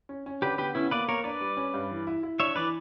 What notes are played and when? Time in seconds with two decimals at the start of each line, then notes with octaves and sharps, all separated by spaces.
0.09 C#4
0.26 C#4
0.42 D3 G4 B4
0.58 B3 G4 B4
0.75 B3 C#4 E4
0.91 A#3 B4 D5
1.08 A#3 A#4 C#5
1.24 D4 B4 D5
1.41 G3
1.57 C#4
1.74 G2
1.91 E3
2.07 E4
2.23 E4
2.40 D4 C#5 E5
2.56 E3 B4 D5